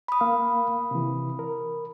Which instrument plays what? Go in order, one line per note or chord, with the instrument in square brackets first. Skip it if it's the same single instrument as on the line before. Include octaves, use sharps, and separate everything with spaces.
[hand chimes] B5 D#6
[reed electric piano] A#3 F5
C3 E3
A#4